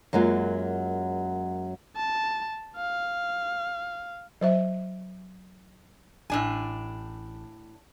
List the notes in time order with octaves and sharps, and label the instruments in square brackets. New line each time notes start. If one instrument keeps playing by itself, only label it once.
[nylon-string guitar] F#2 F#3 G#3 A#3 F4
[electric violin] A5
F5
[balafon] F#3 C5 E5
[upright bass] A1 [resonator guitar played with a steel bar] A2 D4 G#5